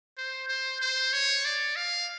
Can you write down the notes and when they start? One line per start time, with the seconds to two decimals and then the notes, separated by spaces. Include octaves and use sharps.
0.18 C5
0.49 C5
0.81 C5
1.13 C#5
1.45 D5
1.76 F5